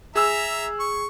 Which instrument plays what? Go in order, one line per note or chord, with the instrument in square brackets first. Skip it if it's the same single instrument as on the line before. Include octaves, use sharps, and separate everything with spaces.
[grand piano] G#4 E6 [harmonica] E5 A#5
[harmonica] C#6